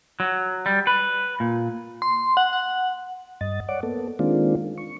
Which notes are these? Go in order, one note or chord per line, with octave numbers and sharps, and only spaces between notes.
F#3
G3
B4
A#2
C6
F#5
F#5
G2 D#5 A6
C#5 D5 F#5 D6
A#3 B3 A4
D#3 G#3 A#3 C4 D4 F4
C#6